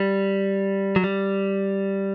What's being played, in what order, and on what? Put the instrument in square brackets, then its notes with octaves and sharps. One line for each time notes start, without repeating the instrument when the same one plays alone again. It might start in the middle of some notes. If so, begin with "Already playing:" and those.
Already playing: [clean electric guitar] G3
F#3
G3